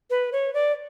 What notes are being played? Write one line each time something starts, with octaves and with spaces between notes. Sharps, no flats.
B4
C#5
D5